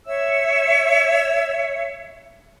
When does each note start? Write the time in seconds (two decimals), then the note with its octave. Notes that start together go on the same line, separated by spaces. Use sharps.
0.06 C#5 E5 E6